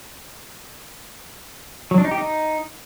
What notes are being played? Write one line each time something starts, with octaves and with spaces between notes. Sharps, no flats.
F#3
D4
D#4
G4
D#4